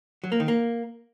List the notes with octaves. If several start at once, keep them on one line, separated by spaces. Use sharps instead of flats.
F#3
A#3
D#3
A#3